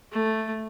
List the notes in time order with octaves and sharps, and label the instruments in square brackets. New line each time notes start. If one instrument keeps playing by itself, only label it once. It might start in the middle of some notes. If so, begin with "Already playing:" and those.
[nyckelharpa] A3